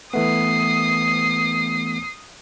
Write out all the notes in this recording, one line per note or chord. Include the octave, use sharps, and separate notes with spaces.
E3 A3 B3 D#6 C7